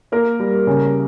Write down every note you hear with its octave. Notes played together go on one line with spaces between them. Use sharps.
A#3 A#4
G3
C#3